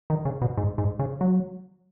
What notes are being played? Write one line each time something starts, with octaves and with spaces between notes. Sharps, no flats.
D#3
C#3
B2
G#2
G#2
C#3
F#3